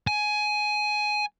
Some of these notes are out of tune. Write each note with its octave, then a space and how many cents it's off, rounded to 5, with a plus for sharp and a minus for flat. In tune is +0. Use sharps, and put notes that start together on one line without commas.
G#5 +15